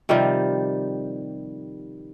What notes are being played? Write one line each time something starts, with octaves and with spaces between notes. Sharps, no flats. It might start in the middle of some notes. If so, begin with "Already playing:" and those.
C3 D#3 F3 G3